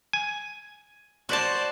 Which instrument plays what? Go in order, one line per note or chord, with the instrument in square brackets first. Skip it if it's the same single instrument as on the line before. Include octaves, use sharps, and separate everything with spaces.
[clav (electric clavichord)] G#5
[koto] F#4 A5 [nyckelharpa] C5 D5